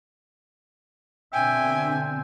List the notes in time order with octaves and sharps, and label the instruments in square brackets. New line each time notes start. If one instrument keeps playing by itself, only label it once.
[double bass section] B2 D3 C4 [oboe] E5 [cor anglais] G5 [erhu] G#5